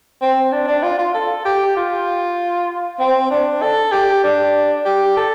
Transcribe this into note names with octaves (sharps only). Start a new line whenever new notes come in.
C4
D4
D4
F4
F4
A4
G4
F4
C4
D4
A4
G4
D4
G4
A4